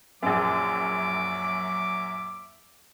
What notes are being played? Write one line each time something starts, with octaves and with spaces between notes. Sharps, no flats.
A#1 F#2 F#3 E5 D6